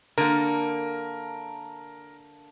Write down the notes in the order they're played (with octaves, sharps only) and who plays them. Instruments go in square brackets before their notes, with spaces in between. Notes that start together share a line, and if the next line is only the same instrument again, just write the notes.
[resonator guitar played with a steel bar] D3 A#3 [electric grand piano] A#4